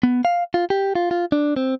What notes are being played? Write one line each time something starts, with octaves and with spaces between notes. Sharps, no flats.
B3
F5
F4
G4
F4
F4
D4
C4